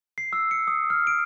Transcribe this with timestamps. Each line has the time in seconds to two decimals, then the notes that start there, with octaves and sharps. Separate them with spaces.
0.18 C7
0.33 E6
0.51 C#7
0.67 D#6
0.90 F6
1.07 D7